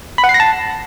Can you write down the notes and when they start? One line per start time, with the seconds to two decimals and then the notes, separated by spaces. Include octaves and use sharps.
0.18 B5
0.24 F#5
0.29 C7
0.34 A#6
0.40 A5